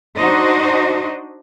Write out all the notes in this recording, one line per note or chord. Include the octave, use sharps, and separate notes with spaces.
D4 D#4 F#4 C5 D#5